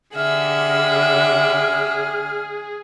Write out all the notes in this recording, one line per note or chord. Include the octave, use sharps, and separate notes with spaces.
D3 G4 G#4 E5 F#5 F6